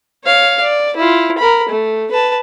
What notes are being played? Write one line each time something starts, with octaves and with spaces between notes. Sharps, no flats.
C#5 F5
D5
E4 F4
A#4 B5
A3
B4 A5